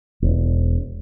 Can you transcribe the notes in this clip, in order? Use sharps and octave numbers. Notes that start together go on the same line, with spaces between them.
E1